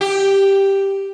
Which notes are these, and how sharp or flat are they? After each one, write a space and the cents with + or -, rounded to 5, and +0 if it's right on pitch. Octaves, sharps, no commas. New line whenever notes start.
G4 +0